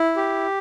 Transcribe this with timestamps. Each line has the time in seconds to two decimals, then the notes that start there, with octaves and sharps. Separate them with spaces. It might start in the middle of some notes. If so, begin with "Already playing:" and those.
Already playing: E4
0.16 G4